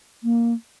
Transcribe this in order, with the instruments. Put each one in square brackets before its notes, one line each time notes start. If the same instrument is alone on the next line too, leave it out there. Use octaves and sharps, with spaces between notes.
[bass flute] A#3